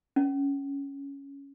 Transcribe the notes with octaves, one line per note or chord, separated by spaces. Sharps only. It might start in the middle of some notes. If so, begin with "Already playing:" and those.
C#4